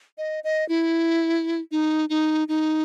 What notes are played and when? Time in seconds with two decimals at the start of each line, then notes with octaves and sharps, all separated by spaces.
0.18 D#5
0.44 D#5
0.69 E4
1.71 D#4
2.09 D#4
2.48 D#4